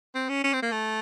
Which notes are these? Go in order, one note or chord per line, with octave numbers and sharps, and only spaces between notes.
C4
C#4
C#4
C4
A#3
A3